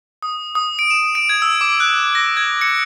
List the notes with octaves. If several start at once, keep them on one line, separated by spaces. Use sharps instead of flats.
D#6
D#6
D7
E7
D7
G#6
E6
D6
F#6
A#6
G#6
C#7